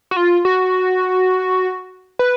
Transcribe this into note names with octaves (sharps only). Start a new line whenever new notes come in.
F#4
F4
F#4
B4